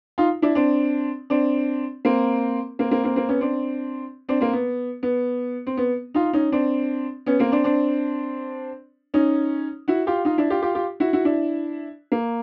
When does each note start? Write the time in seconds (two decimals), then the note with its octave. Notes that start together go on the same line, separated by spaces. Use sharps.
0.18 D#4 F4
0.42 D4 E4
0.55 C4 D4
1.30 C4 D4
2.05 A#3 C4
2.79 A#3 C4
2.91 A#3 C4
3.04 A#3 C4
3.16 A#3 C4
3.29 B3 C#4
3.41 C4 D4
4.29 C4 D4
4.40 A#3 C4
4.53 B3
5.03 B3
5.67 C4
5.77 B3
6.14 D#4 F4
6.33 C#4 D#4
6.52 C4 D4
7.26 B3 C#4
7.39 A#3 C4
7.52 C4 D4
7.64 C4 D4
9.14 C#4 D#4
9.88 E4 F#4
10.07 F4 G4
10.25 D#4 F4
10.38 D4 E4
10.50 F4 G4
10.62 F4 G4
10.75 F4 G4
11.00 E4 F#4
11.13 E4 F#4
11.25 D4 E4
12.12 A#3